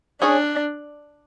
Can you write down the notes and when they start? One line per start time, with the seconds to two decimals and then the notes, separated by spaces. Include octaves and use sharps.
0.22 C#4 D4 G#4 C#5